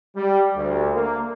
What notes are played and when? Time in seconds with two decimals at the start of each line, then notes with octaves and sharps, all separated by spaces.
0.16 G3
0.56 D2
0.94 A#3